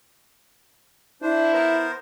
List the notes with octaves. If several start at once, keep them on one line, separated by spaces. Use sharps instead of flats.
D4 E4 C5
B3 A#4 C5